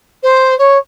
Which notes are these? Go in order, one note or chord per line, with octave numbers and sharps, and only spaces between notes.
C5
C#5